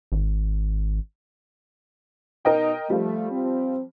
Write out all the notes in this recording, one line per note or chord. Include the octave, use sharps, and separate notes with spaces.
G#1
B2 D#4 A#4 D#5 G5
F3 G3 A3
C4